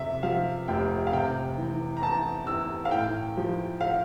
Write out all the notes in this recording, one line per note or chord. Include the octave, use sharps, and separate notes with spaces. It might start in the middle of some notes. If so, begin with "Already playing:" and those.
Already playing: F2 C3 E5
F3 F5
F1 G5
F5
C3 G5
E3
A#5
E2 A5
E2 E6
F5
A2 G5
F3
F5